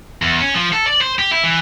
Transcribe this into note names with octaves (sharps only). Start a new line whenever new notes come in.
E2
C#4
F3
A4
D5
C5
G4
E4
E3